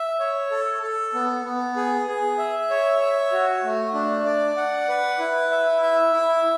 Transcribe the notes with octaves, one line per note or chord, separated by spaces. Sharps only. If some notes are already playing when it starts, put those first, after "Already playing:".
Already playing: E5
C#5
A4
A4
B3
B3
G#4
G#4
E5
C#5
E5
F#4
A3
D4
D5
F#5
B4
E4
E5
E5
E4